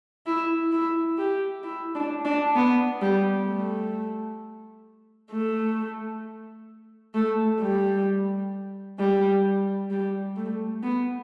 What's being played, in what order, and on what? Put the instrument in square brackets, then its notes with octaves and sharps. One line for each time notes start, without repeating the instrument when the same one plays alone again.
[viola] E4
E4
G4
E4
D4
D4
B3
G3
A3
A3
A3
G3
G3
G3
A3
B3